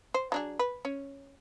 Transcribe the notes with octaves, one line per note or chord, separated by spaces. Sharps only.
C5
F#3 D4 G#4
B4
C#4